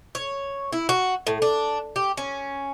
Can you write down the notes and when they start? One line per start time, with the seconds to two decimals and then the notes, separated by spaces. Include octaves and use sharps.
0.15 C#5
0.73 E4
0.89 F#4
1.27 A2
1.42 D4
1.96 G4
2.17 C#4